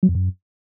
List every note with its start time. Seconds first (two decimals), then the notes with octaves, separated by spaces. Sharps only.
0.03 F#3
0.09 F2
0.15 F#2